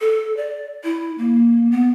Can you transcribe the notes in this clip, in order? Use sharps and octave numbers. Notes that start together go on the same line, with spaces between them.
A4
D5
E4
A#3
B3